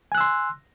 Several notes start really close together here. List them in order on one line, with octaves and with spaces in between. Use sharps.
G#5 F#6 E6 C6